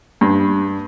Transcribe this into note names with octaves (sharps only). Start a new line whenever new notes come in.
G2